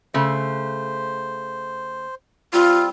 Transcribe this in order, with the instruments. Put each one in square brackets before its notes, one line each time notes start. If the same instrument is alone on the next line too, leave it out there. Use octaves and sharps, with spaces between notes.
[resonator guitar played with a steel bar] C#3 A3 [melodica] C5
[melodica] G3 C4 [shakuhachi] F4